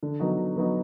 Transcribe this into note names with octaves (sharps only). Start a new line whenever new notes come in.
D3
F#3 B3 D#4 F#4
D3
F#3 B3 D#4 F#4